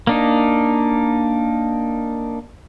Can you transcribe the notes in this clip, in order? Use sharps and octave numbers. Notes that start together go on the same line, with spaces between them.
A#3 D4 D#4